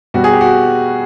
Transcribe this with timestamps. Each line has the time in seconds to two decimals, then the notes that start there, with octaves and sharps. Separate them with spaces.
0.14 B2 G3 F#4
0.24 G#4
0.32 G4
0.41 F#4